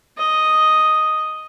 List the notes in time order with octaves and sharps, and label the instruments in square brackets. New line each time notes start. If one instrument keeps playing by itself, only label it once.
[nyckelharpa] D#5